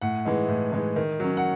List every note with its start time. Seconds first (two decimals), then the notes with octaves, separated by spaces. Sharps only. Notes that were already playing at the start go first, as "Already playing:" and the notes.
0.02 A2 F#5
0.25 E3 G#3 D#4
0.49 A2
0.72 E3 G#3 D#4
0.96 D#3
1.20 F#3 C#4
1.37 F#5